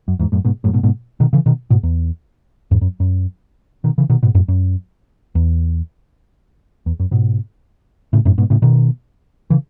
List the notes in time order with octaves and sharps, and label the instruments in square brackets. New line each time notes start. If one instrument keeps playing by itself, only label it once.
[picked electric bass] F#2
E2 G#2
F#2 A2
G#2 B2
F#2 A2
G#2 B2
G#2 B2
B2 D#3
C#3 E3
B2 D#3
G#2 B2
E2
E2 G#2
F#2
F#2
B2 D#3
C#3 E3
B2 D#3
G#2 B2
F#2 A2
F#2
E2
E2
F#2
G#2 B2
A2 C#3
F#2 A2
G#2 B2
A2 C#3
B2 D#3
C#3 E3